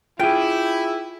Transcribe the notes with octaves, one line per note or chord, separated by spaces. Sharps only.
E4 F4 G#4 G5